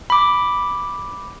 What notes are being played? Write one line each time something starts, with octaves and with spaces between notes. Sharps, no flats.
B5 D6